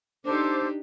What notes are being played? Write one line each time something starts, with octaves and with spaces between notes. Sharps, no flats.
D4 D#4 G4 A4 C5 D6